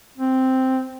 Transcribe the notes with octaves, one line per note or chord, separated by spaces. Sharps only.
C4